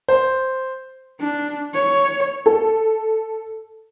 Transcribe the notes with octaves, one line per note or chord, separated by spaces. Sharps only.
C5
D4
C#5
A4